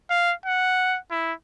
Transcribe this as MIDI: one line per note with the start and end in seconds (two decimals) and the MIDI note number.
0.10 0.33 77
0.46 0.98 78
1.11 1.33 64